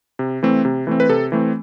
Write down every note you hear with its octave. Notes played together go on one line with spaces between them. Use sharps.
C3
E3 A3 C4
C3
E3 A3 C4
B4
C3 A4
E3 A3 C4